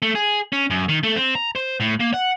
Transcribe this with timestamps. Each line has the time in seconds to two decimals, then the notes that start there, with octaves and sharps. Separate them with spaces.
0.02 A3
0.15 G#4
0.53 C#4
0.70 F#2
0.89 D#3
1.03 A3
1.16 C4
1.35 A#5
1.55 C5
1.80 A2
2.00 A#3
2.14 F#5